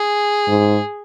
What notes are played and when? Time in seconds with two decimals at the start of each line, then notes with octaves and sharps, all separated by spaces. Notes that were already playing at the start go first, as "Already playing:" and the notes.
Already playing: G#4
0.48 G#2